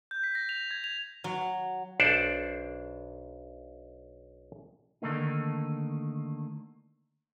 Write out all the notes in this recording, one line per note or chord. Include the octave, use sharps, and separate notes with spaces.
G6
B6
A#6
F7
G#6
F7
F#3
B1 D4 A4 C5 D5
D3 D#3 A3 A#3 D#4